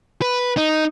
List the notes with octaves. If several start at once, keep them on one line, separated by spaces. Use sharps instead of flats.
B4
D#4